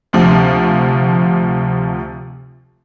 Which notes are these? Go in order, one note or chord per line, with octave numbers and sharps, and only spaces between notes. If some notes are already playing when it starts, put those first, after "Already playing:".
D2 C3 F3